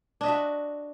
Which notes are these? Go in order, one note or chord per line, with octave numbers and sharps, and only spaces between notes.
D4 F#4 D#5 E5